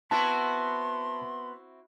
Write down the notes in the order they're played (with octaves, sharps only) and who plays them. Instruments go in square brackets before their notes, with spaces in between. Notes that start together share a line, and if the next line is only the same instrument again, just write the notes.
[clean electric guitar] B3 [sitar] C4 E4 F#4 [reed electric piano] A5 [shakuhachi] C6